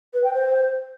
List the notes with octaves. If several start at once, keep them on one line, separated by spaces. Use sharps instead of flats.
B4
G5
C5